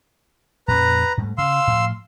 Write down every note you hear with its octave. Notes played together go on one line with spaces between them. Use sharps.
F2 A#2 C#4 B4 A#5
G#2 G3 A3
C#3 F5 C6 E6
A2 F3